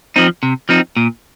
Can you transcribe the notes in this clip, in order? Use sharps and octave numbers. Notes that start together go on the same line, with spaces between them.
F3 C4 D#4
C3
F3 C4 D#4
A#2